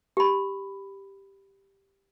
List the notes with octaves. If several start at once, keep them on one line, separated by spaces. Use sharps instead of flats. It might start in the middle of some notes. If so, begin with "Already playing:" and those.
G4 B5